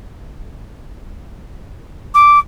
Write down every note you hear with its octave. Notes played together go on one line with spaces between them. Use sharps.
D6